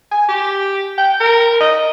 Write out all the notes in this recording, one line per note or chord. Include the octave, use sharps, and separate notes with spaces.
G#5
G4
G5
A#4
D#5